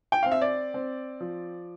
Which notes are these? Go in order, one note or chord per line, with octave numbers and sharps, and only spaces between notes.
G5
C4 F5
E5
D5
C4
F3